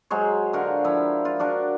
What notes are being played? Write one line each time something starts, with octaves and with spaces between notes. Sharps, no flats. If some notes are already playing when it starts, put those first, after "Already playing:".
F#3 G#3 C5 C#5
D3 F4 F#4 A#4
F3 E4
F4
D4 F#4 A#4